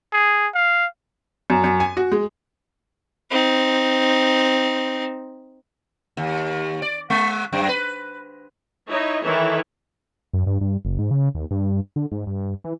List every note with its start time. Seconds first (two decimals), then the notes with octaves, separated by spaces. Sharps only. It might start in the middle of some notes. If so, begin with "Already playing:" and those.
0.13 G#4
0.54 F5
1.50 F#2
1.64 F#2
1.80 G#5
1.97 F#4
2.12 G#3
3.31 C4 D#4
6.17 D#2
6.82 D5
7.10 G#3
7.53 F#2
7.69 B4
8.88 D#4 E4 C#5 D#5
9.23 D#3 E3 E4 A4 C#5
10.33 F#2
10.47 G2
10.61 G2
10.85 F#1
10.99 G#2
11.11 C#3
11.35 D#2
11.51 G2
11.96 D3
12.12 G#2
12.27 G2
12.64 E3